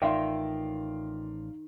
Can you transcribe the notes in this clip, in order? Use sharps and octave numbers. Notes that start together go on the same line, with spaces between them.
A1 D#3 F4 D5 E5 F5 G5 C6